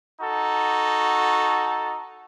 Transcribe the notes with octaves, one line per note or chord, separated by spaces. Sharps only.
D#4 F#4 A4